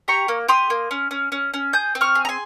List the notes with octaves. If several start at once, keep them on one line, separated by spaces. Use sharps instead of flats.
G4 A#5 C#6
A#3
G4 C6 D#6
A#3
C#4
C#4
C#4
C#4
G#4 D#6 G6
C4
C#6 F6
G#4
A#5
G#5 C6